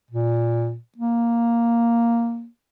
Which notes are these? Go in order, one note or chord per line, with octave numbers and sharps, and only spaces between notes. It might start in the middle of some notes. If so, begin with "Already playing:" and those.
A#2
A#3